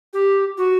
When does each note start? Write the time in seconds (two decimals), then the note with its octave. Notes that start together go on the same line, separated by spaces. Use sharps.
0.13 G4
0.58 F#4